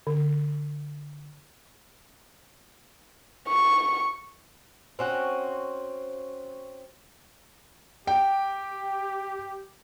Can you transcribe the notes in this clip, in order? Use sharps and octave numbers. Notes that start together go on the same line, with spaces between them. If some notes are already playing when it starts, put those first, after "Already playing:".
D3
C#6
C4 C#4 F#4
G4 G5